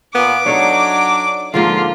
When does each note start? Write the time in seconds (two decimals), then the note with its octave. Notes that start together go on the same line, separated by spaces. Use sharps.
0.15 A#2 B3 D6
0.46 F#3 D4 D#4 A4 C#5
1.54 G#2 D3 F3 A#3 F4